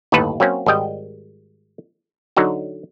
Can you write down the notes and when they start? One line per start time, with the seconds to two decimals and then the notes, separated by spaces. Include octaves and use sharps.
0.12 G1 D#2 A2 A4 B4 A5
0.40 F#3 A#3 C4 C#4
0.66 G#1 G3 D#5 G5
2.37 D3 F#3 D#4 F#4